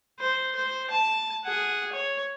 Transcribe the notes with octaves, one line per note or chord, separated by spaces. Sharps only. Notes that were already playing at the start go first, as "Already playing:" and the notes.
C5
C5
A5
G#4 F#5
C#5